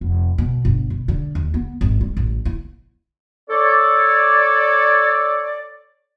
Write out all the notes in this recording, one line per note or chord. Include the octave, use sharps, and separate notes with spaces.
F1
B2
G1
B2
D3
D#2
B3
G#1
G3
A1
E4
A4 C#5 D5